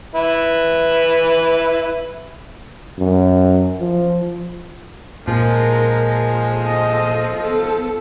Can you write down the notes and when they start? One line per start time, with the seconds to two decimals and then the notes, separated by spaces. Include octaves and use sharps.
0.15 E4 B4
2.98 F#2
3.79 F3
5.28 A#2 F3 G#3 A#4
6.53 A4 D#5
7.40 B3 A4